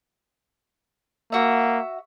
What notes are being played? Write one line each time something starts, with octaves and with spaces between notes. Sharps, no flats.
A#3 F#4 E5